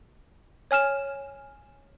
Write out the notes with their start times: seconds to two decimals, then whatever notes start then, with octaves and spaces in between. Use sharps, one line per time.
0.71 C#5 G#5 F6 E7